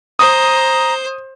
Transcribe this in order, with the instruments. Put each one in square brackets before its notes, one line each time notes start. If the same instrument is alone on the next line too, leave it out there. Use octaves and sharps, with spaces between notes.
[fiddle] C5 [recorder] A#5 [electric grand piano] D#6